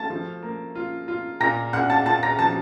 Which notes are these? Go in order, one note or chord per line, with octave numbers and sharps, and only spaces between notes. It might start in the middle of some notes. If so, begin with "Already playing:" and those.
Already playing: A3 A5 A6
F3
A#3
F4
F4
A#2 A#5 A#6
A#2 F#5 F#6
A5 A6
A#2 A5 A6
A#5 A#6
F3 A5 A6